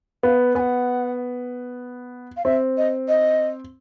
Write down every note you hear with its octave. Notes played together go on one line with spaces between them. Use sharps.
B3 F5
B3 F#5 G#5
F5
C4 E5
D#5
D#5